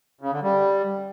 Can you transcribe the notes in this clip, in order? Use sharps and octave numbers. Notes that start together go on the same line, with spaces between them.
C#3
D3
G3